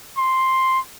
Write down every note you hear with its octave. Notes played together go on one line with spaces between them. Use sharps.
C6